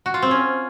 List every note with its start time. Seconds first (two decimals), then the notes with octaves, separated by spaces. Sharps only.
0.06 F#4
0.14 F4
0.22 C4
0.31 C#4